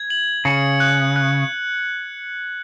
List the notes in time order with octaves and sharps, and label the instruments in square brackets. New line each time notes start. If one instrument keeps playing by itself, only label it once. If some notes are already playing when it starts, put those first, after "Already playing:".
Already playing: [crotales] G#6
F#7
[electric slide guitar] C#3 [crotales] C#7
[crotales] F#6
F#6